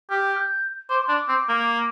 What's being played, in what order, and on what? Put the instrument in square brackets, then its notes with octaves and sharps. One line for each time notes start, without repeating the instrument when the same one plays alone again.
[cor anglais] G4 [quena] F6
[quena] G6
[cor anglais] C5 [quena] D6
[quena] C6
[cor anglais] D4
[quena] D6
[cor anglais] C4
A#3